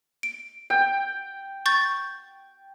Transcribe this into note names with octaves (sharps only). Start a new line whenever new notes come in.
D7
G5
C#6 G6 A6